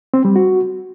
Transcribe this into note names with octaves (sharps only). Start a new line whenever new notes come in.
C4
G3
F#4